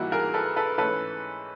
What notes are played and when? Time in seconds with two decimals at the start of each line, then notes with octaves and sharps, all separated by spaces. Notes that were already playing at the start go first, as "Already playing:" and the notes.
Already playing: G#2 E3 G3 A#3 E4 F#4
0.12 G#4 A#4
0.34 A4 B4
0.56 A4 B4
0.78 G#2 E3 A3 C#4 A4 B4